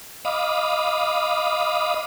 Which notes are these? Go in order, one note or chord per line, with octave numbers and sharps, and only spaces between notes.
D#5 F5 B5 D6 D#6